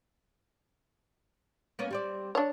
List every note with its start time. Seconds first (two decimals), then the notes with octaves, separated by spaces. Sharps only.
1.79 A#3 B3 C#4
1.91 G3 C4 D5
2.35 D4 C#5